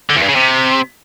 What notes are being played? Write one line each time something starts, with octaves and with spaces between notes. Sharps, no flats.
D3
E2
G2
C#3
C3